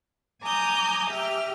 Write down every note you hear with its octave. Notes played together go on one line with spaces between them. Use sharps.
G#5 A#5 D6 D#6 G6
G4 E5 F6